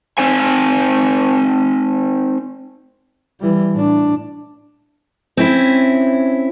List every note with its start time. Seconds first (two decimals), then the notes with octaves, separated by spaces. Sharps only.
0.18 C4 D#4 C5 G#5
3.40 E3 G3
3.72 A2 D4
5.37 C4 C#4 E4